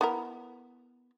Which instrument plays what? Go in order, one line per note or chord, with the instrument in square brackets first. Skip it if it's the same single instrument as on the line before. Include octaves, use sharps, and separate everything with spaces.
[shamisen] B3 E4 A#4